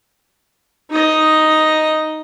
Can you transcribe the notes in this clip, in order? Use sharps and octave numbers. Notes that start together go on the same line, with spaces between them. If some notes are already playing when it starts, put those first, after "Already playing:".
D#4 D#5